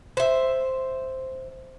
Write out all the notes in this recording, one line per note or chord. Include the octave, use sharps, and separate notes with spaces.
C5 E5